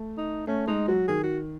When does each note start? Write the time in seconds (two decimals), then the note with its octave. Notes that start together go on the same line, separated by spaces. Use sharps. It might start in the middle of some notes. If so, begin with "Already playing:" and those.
Already playing: A3
0.18 D#4
0.47 A3 C#4
0.67 G#3 D#4
0.88 F#3 F#4
1.08 D#3 G#4
1.23 F#4